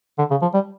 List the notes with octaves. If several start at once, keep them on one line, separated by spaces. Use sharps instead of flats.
D3
C#3
F3
G3